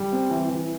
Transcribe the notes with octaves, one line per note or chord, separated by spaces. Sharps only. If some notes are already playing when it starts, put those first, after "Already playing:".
Already playing: G3
C4
E3
E3